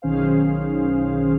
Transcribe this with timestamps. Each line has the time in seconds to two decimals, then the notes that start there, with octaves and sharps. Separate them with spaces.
0.02 B1 D#3 C#4 G#4 C5 F5